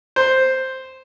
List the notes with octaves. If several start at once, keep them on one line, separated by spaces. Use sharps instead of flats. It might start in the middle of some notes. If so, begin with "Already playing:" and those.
C5